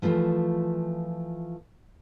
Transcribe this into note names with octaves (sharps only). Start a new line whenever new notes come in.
E3 F3 A3 F4